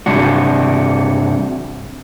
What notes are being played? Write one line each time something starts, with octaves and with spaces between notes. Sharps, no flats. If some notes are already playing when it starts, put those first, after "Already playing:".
G2 C3 D4 F#4